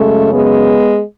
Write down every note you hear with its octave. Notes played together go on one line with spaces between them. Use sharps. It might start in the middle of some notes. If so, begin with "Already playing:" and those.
Already playing: F#2 C#3 G#3 A3 C#4
G#3 B3